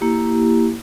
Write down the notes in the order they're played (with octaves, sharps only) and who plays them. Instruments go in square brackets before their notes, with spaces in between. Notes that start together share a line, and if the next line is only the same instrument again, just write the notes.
[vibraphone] A#3 E4 G4